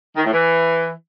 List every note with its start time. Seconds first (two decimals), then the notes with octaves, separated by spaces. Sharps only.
0.16 D#3
0.25 A2
0.33 E3